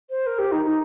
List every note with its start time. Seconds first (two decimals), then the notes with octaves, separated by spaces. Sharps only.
0.10 C5
0.27 A#4
0.39 G4
0.52 D#4
0.65 D#4